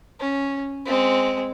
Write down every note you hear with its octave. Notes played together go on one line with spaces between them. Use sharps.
C#4
G#3 C4